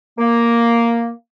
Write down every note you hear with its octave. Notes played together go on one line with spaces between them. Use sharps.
A#3